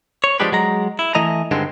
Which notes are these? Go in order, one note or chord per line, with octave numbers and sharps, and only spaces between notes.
C#5
F3 G3 G#3 D4 G4 B4
F#3 G#3 A#5
E4
E3 A3 D#5 A#5
G2 D3 D#3 G#3 C4